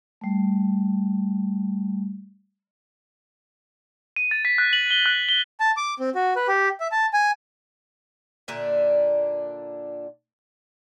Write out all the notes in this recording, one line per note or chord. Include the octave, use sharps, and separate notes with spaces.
G3 A3
D#7
A6
B6
F#6
F#7
G7
F#6
G7
A5
D6
C4
F#4
B4
G4
E5
A5
G#5
A#2 D3 D4 E5